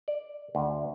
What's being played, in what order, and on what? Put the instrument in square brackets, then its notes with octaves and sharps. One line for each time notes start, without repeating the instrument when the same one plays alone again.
[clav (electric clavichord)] D5
D2